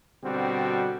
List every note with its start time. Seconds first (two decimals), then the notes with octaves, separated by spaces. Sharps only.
0.24 B2 D3 G3 C4 F#4